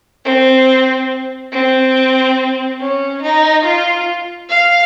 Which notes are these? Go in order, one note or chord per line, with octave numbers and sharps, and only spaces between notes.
C4
C4
C#4
D#4
F4
F5